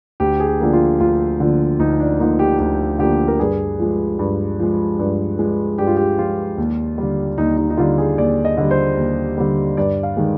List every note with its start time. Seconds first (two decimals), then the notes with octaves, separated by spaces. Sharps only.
0.20 D2 G4
0.40 G#4
0.47 G4
0.60 D3 F3 A#3
0.73 F4
1.00 D2 F4
1.40 D3 F3 A#3
1.79 D2 D#4
2.00 D4
2.19 D3 F3 A#3 D#4
2.39 G4
2.59 D2 G4
2.99 D3 F3 A#3 G4
3.28 A#4
3.39 G2 G#4
3.79 F3 G#3
4.19 G2
4.59 F3 G#3
4.99 G2
5.39 F3 G#3
5.78 G2 G4
5.87 F4
5.97 G4
6.19 F3 G#3 F4
6.58 D#2
6.98 D3 G3
7.38 D#2 D#4
7.57 D#4
7.70 D#4
7.77 D3 G3 F4
7.98 G#4
8.18 D#2 D5
8.45 D#5
8.57 D3 G3
8.71 C5
8.97 D#2
9.38 D3 G3
9.77 G2 D5
10.03 F5
10.17 D#3 G#3